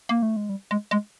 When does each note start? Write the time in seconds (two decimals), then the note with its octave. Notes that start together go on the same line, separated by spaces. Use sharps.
0.09 A#3
0.23 A3
0.36 G#3
0.49 G3
0.71 G#3
0.91 G#3